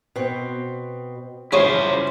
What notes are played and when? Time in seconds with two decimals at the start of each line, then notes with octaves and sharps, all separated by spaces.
0.16 B2 C4
1.52 F#2 C#3 F3 E4 G#4 C5 C#5 G#5